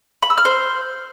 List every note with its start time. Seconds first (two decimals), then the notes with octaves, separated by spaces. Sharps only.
0.22 B5
0.30 E6
0.38 F6
0.45 C5